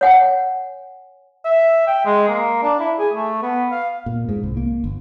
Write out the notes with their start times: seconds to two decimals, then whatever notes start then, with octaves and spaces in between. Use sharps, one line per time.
0.01 C#5 F#5 G#5
1.45 E5
1.87 G5
2.06 G#3
2.29 A#3
2.63 D4
2.80 E4
2.99 G#4
3.13 A3
3.42 B3
3.71 F5
4.06 A#2
4.29 G#2
4.43 C2
4.57 A#3
4.84 G1